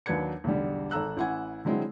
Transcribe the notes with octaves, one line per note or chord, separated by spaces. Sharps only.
D#2 F#3 D4 B4 G#6 C#7
B1 E2 D3 G3
G#1 A4 A#5 E6 F#6
A1 E4 F#5 G#5 G#6
D3 F#3 G#3 C4 E4